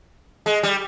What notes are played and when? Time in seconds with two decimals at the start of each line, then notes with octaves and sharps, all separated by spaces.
0.46 G#3
0.63 G3